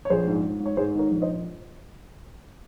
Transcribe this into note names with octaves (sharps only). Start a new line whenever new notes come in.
C#5
A#1 G#4 C5
G#2
G#2
G#2
C#5
G#2 G#4 C5
D#3 A#4 C#5
A#1
C5 D#5